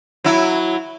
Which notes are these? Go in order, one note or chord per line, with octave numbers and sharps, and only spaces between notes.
F#3 E4